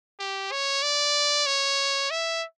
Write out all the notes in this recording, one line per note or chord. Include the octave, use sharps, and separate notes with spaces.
G4
C#5
D5
C#5
E5